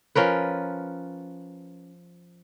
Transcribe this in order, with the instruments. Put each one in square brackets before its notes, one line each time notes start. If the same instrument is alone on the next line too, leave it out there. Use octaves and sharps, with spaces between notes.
[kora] F3 C#4 A#4 B4